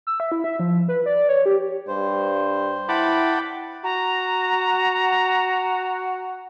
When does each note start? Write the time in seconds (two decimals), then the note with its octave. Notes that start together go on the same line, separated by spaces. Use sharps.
0.07 E6
0.20 E5
0.32 E4
0.44 E5
0.59 F3
0.88 B4
1.06 D5
1.29 C#5
1.46 G4
1.88 G2 C5
2.89 E4 F#5 G5 A5 B5 D6
3.84 F#4 A#5